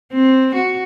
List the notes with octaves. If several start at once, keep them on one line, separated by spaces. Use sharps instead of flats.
C4
F#4